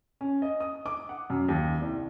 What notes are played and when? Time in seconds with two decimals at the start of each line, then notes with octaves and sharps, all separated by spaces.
0.21 C#4
0.42 D#5
0.60 D#6
0.86 D6
1.09 F#5
1.30 F#2
1.48 D#2
1.82 C2